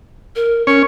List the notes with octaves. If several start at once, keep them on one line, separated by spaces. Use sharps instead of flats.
A#4
C#4 A#4 C#5